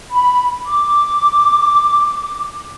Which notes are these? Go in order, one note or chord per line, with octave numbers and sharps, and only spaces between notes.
B5
D6